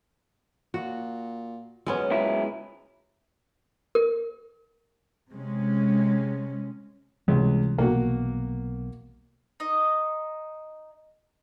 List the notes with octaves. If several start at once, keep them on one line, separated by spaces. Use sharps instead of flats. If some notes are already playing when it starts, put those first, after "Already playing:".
A#2 F#4
F#2 G#3 B3 C#4
C#2 F#3 E4
A#4
C3 G#3 C#4
C#2 C3 E3 G3
B1 B2 A#3 F#4
D#4 D#5